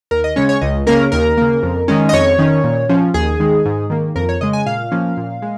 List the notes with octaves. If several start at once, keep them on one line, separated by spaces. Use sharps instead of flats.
D#2 A#4
D#5
C#3 G#3 C#4 C#5
C#5
C#2 D#5
C#3 A#3 C#4 A#4
D#2 A#4
C#3 A#3
F2
D#3 G#3 C#4
D#5
F2 C#5
D#3 C#4
A#2
F3 C#4
D#2 G#4
D#3 G#3
G#2
D#3 A#3
F2 A#4
C#5
C#3 G#3 D#5
G#5
A#2 F5
F3 A#3 C#4
A#2
G#3